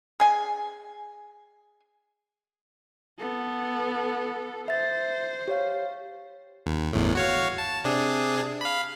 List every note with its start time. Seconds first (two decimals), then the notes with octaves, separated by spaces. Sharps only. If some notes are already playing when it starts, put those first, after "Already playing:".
0.20 G#4 G#5
3.19 B3 A4
4.68 C5 E5 A6
5.48 G4 C#5 F5
6.66 D#2
6.93 G1 E2 A2
7.15 F#4 C#5 F5
7.58 A5
7.84 C3 D4 G#4
8.61 F5 B5